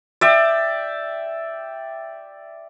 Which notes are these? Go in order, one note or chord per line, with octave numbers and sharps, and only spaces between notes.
D5 E5 G5